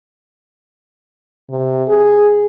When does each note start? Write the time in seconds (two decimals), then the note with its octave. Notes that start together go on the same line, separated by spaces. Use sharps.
1.50 C3
1.88 G#4